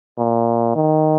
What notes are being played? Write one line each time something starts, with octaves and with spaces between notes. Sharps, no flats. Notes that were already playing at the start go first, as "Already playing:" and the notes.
A#2
D#3